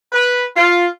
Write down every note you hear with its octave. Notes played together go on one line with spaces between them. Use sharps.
B4
F4